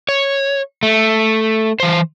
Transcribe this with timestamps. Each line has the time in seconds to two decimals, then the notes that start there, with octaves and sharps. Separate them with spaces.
0.09 C#5
0.83 A3
1.80 E3 C5